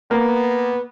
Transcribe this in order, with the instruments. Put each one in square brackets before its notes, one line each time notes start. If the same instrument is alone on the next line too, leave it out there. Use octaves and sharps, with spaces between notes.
[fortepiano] A#3 [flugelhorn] B3